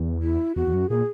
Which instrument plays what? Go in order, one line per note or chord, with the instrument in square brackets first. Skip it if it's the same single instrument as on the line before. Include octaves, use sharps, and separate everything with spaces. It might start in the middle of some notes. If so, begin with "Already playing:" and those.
Already playing: [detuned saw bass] E2
[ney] E4
[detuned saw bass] E2 [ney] F#4
[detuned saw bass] E2
F#2
[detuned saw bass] A#2 [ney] G#4